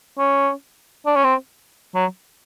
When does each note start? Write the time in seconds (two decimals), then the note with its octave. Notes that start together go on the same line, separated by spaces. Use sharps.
0.18 C#4
1.06 D4
1.16 C#4
1.24 C4
1.95 F#3